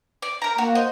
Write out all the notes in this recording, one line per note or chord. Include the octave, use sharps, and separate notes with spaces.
D5
A#4 A#5
A#3 F#4
C5 D#5